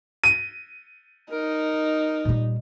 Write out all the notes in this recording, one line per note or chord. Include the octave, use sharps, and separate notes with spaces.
D#7
D#4 A#4
A#2 G3